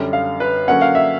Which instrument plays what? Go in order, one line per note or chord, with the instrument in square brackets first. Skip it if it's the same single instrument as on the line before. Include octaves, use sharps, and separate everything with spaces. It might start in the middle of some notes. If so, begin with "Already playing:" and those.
Already playing: [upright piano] F#2 D3 G3
F5
B4
D3 F#3 A#3 C#4 F#5
F5
E5